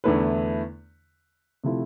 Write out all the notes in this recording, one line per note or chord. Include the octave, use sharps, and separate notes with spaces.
E2 D3 A3 E4 B4
C3 F3 A3 E4